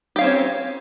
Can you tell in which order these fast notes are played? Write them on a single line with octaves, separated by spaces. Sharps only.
G4 F5 C#4 C4 C#5